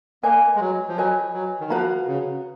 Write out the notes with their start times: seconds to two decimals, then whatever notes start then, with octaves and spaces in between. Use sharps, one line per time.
0.23 A#3 B4 D#5 G#5
0.55 G#3
0.60 F#3
0.88 F3
0.97 F#3 B4 D#5 G#5
1.33 F#3
1.60 D#3
1.70 F3 F#4 B4 F5 A#5
2.07 C#3